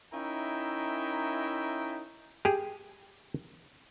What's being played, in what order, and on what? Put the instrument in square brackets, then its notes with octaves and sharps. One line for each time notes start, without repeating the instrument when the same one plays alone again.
[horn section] C#4 D#4 E4 A#4 E5 G5
[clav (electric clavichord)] G4 G#4